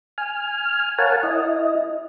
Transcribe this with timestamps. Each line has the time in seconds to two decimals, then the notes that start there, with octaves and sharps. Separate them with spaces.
0.18 G#5 F6
0.98 A#4 C#5 F5 F#5 G#5 A5
1.23 E4 D#5